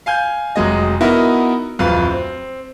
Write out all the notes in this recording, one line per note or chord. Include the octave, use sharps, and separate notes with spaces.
F5 G#5 G6
F1 F#3 G#3 D#5
B3 D#4 E4 F#4 A#4 E5
D1 F2 B4 F5
C4